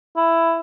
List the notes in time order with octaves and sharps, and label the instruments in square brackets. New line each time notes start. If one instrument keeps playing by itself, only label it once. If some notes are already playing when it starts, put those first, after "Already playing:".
[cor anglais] E4